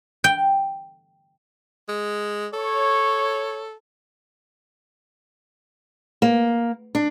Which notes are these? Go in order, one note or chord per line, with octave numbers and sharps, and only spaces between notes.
G5
G#3
A4 C#5
A#3
D4